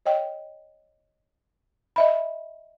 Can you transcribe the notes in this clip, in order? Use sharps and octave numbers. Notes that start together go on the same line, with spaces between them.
C#5 D#5 G5
D#5 E5 B5